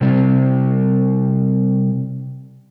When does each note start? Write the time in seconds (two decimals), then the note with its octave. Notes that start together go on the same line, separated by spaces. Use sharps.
0.01 C3 G3 C4